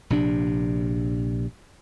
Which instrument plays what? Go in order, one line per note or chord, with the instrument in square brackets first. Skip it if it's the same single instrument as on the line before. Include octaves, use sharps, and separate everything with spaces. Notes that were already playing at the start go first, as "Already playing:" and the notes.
[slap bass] A#1 C3 D4